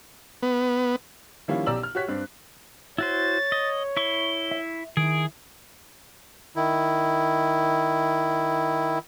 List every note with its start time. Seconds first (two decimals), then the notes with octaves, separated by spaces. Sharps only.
0.43 B3
1.48 D#3 F3 G3 A#3 C#4 E4
1.66 B1 G4 D5 A#5 E6 F#7
1.83 F6
1.95 F#4 G4 C#5 F#6 B6
2.08 G2 C4 D4
2.98 E4 F#4 C5 C#5 A6
3.52 D#5
3.97 E4 C#6 G7
4.51 E5
4.97 D#3 E4 G#4 D7
6.56 D#3 E4